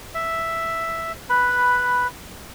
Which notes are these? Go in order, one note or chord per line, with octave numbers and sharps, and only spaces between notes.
E5
B4 B5